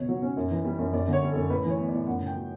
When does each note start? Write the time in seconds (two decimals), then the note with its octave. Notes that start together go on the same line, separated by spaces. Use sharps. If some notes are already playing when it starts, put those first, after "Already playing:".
Already playing: C#2 B2 C#5
0.09 F#3
0.22 C#4
0.37 F#2
0.51 E3
0.64 G3
0.78 F#2
0.93 F#2 D5
1.08 D3
1.13 C#5
1.22 G3
1.31 F#2 A4
1.50 A2 B4
1.64 E3
1.70 C#5
1.79 B3
1.88 D5
1.93 A2
2.06 F#2 F#5
2.21 C#3
2.26 G5
2.35 F#3